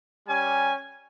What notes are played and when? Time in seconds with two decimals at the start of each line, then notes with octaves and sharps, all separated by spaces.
0.26 G3 C#4 G4 G#5